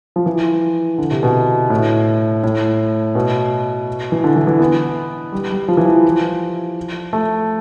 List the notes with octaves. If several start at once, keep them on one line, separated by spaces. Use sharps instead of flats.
F3
E3
D3
C3
B2
A2
A2
B2
E3
D3
E3
E3
B3
G3
G3
F3
E3
F3
A3